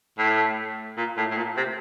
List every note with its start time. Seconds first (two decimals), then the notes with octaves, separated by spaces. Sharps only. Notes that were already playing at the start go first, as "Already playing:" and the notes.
0.19 A2
0.97 A#2
1.17 A2
1.31 A2
1.37 A#2
1.57 C3